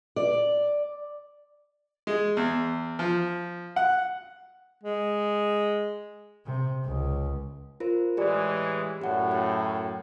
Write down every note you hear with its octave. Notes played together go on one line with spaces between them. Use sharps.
D5
G#3
E2
F3
F#5
G#3
C3
C#2
F4 A#4 C5
A2 E3 G#3 G4 D5
F#2 A2 G4 F#5
G5